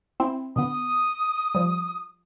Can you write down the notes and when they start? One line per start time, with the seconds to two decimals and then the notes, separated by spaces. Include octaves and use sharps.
0.20 C4 E4
0.56 B2 D3 B3 D#6
1.55 F3 G3